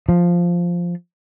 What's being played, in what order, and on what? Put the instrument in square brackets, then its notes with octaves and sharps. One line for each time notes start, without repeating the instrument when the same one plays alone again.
[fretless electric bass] F3